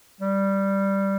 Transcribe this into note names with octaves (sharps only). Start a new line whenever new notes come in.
G3